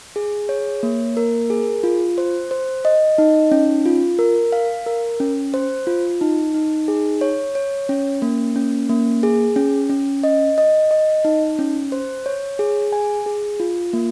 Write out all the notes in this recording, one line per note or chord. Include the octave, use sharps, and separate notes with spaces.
G#4
C#5
A#3
A#4
G#4
F4
C5
C5
D#5
D#4
C#4
F4
A#4
F5
A#4
C#4
C5
F4
D#4
D#4
G#4
C#5
C#5
C#4
A#3
C#4
A#3
G#4
C#4
C#4
D#5
D#5
D#5
D#4
C#4
C5
C#5
G#4
G#5
G#4
F4
A#3